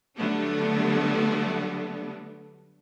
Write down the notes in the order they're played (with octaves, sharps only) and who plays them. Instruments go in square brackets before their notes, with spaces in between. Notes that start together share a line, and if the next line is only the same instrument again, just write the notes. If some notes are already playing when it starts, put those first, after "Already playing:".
[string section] D3 F#3 G3 A3 B3 D4